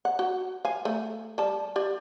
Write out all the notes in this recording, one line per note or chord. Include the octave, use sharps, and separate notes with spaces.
F#5
F#4
F5 G#5
A3
G3 A5
G4 D5